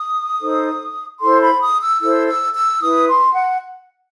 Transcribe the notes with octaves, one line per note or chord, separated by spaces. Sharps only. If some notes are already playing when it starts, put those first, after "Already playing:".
Already playing: D#6
D#4 A4 C5
E4 A4 C5 C6
B5
D#6
E6
E4 A4 C5 E6
E6
E6
E4 B4 D#6
C6
F#5